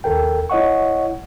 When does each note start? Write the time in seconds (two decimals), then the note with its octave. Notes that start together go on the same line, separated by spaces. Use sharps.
0.04 D#2 A4 A#4 G5
0.50 E4 C#5 D#5 F#5 C#6